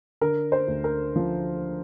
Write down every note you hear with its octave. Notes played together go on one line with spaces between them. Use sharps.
D3 A#4
C5
D2
A#4
F3